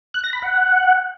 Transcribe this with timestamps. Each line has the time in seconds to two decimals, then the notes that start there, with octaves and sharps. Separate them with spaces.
0.14 F#6
0.24 A#6
0.33 B5
0.42 F#5